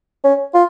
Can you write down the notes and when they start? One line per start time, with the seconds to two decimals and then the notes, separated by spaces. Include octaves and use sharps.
0.24 C#4
0.54 F4